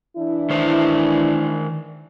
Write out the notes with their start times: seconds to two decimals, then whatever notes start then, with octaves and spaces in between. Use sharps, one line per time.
0.17 E3 D4 E4
0.50 D#3 C5